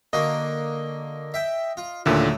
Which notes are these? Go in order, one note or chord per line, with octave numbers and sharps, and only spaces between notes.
D3 A#3 F#4 D#5
E5 G5
F4
D#2 A#2 D3 F#3 A3